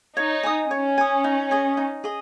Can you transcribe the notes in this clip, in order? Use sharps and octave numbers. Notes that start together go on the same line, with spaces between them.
D#4 C#5
G#5 D#6
C#4 C#5
G#5 D#6
D#4
G#4 D#5 G#5
D#4
G#4 D#5